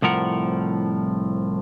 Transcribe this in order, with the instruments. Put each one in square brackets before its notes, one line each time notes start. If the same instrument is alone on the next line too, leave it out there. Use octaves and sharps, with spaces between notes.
[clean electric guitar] C2 A2 F3 A#4 F#5